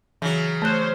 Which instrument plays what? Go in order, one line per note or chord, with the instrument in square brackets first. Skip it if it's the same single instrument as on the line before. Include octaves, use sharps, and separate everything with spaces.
[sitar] C#3 F#3 [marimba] E3
[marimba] A3 F#6 [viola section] C5 C#5